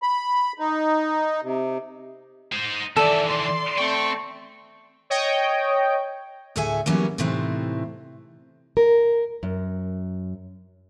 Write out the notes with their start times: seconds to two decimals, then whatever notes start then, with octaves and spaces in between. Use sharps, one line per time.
0.02 B5
0.59 D#4
1.43 C3
2.52 D#4 C5
2.96 D#3 E3 A4 D5 E5
3.28 D5 C6
3.78 A3 C4 G5 C#6
5.10 C#5 D#5 G5
6.56 D2 A2 G#4 A4 E5 G#5
6.86 E3 F#3 G3 A#3 B3 C#4
7.18 A2 C3 E3 A3 C4 D#4
8.77 A#4
9.43 F#2